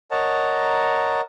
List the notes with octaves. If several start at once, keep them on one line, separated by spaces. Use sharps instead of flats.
A#4 C#5 D#5 F#5 A5 A#5